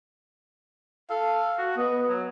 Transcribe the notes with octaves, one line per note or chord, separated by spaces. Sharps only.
A4 F5
F#4
B3 D#5
F#3